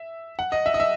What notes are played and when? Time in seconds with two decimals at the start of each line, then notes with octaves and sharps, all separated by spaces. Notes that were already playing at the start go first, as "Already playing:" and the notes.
Already playing: E5
0.39 F#5
0.52 D#5
0.66 E5
0.74 D#5
0.80 E5